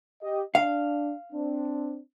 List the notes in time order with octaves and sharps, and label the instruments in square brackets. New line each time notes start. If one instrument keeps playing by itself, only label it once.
[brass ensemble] G4 D#5
[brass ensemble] D4 [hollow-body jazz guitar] F5
[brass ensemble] C4 D4